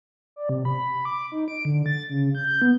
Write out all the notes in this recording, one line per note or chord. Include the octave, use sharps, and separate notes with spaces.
D5
C3
B5
D6
D#4
D7
D3
A6
C#3
G6
B3